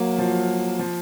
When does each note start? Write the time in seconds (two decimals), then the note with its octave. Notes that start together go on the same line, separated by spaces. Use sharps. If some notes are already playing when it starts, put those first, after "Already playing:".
Already playing: F#3 A#3
0.18 F3
0.79 F3